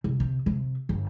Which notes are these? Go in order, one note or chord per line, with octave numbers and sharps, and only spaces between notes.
C2
C3
C3
G1